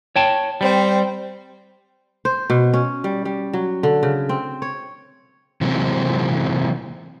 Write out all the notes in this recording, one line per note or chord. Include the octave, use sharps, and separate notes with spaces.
C#5 G5 A5
G3 C4
C5
B2
C#4
G3
G3
F#3
D3
C#3
C4
C#5
C3 E3 F#3 G#3 A#3 C4